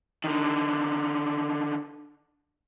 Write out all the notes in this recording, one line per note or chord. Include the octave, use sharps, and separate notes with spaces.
D3 D#3